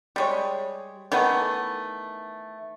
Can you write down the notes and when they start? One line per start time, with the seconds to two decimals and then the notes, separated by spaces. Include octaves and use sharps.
0.16 G3 G#3 C#5
1.12 D#3 E3 A3 B3